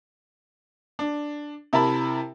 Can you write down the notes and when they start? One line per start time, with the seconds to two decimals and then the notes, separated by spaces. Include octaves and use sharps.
0.99 D4
1.73 C3 E4 A#4 A5 B5